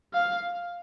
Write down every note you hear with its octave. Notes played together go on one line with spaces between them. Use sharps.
F5